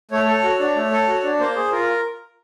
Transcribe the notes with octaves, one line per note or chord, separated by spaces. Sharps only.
A3 C#5
A4
F#4
D4
A3
A4
F#4
D4
A#3 C5
G#4
F4 A#4